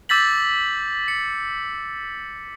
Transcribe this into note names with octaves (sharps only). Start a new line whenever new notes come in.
D6 E6 G6 A6 B6 F#7
C#7